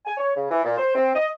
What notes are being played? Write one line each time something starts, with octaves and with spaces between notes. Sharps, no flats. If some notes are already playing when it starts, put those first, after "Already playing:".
G#5
C#5
C#3
E3
A#2
C5
C4
D#5